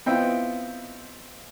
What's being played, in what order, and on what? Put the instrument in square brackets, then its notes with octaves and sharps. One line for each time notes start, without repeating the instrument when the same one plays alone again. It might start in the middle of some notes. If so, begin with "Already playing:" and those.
[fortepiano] B3 C4 E4 F4 D#5 G5